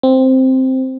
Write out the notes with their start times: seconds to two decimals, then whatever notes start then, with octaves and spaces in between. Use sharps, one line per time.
0.03 C4